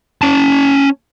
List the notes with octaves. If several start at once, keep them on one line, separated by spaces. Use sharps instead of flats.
C#4 A5